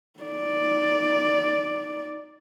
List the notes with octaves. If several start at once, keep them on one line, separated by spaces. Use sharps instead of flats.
D#4 D5